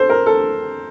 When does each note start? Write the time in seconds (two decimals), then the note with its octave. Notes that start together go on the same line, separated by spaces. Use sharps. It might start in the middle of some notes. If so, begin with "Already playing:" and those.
Already playing: A4 C5
0.09 A#4
0.26 A4